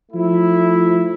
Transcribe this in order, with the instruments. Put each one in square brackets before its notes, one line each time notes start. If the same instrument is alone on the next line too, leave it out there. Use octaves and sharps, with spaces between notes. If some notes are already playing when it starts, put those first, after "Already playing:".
[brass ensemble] F3 A3 E4